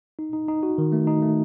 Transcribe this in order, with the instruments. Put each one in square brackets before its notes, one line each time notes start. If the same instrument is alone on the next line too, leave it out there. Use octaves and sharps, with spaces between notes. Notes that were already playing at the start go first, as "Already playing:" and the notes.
[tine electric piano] D#4
D#4
D#4
F#4
D#3
A3
D#4
A3